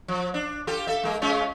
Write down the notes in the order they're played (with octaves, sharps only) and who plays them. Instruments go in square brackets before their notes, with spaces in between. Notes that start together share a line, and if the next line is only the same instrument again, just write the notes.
[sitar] F3
D4
F4 G4 A4
A4 E5
G#3 A#3
G#3 C#4 F4